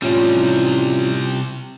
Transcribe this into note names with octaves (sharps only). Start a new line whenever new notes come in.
A2 C3 E3 F3 G3 C#4 F4 C#5